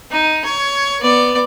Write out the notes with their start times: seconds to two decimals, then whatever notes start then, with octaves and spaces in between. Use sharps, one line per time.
0.11 D#4
0.45 C#5
1.00 B3 D5